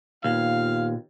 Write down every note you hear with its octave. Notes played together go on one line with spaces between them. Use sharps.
D#2 A#2 B3 F4 F5